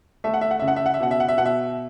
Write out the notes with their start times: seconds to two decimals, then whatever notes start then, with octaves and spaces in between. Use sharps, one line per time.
0.24 A3 E5
0.34 F#5
0.41 E5
0.51 F#5
0.59 C#3 E5
0.68 F#5
0.76 E5
0.86 F#5
0.94 E5
1.00 B2 F#5
1.11 E5
1.20 F#5
1.28 E5
1.37 B2 F#5
1.45 E5